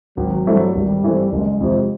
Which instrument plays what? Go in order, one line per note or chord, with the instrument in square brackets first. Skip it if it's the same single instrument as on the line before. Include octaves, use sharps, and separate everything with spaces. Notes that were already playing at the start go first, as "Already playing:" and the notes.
[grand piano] G#1 [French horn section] F#3
[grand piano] G2 E3 A3 C4
[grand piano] G#1 [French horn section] G3
[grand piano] G2 E3 A3 C4
[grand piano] F#1 [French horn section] G#3
[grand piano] F2 C3 F3